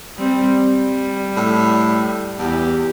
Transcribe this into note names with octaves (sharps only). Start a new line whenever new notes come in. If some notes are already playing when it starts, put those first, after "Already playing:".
G3 C4
G3
A2
E2 G4